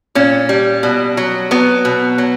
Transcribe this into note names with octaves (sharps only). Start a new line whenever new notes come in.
A#2 C#4
G3
B2
F#3
F#3 B3
B2
F#3